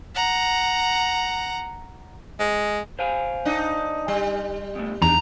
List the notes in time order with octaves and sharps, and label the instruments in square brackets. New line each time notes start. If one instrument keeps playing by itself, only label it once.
[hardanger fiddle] F#5 A#5
[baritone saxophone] G#3
[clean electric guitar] C5 F5 G#5
[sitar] D4 D#4
G3
[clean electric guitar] E2 A3
[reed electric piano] E2 [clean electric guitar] D4 D#4 [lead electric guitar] A#5